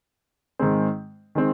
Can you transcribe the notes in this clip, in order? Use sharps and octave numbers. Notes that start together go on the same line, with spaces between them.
G#2 D#3 G#3 C4
D#3 G#3 C4